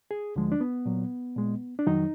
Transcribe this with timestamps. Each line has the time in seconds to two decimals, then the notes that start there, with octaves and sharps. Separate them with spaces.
0.11 G#4
0.36 D2 D3 F3 G#3
0.52 D4
0.61 B3
0.86 A#2 F#3
1.36 A#2 G#3
1.79 D4
1.87 F2 D#3 F#3 D#4